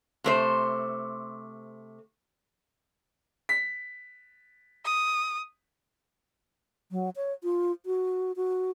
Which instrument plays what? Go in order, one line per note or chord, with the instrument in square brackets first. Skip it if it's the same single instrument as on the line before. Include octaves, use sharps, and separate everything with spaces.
[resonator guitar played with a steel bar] C3 A3 C5
[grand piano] B6
[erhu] D#6
[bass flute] F#3
C#5
F4
F#4
F#4